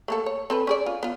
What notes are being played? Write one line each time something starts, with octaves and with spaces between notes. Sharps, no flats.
A3 A#3 A4
C#5
C4 A4 B4
C#4 G#4 D5
F4
B3 F4